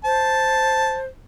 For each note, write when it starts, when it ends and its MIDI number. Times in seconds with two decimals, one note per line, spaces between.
0.05 1.06 72
0.05 0.97 81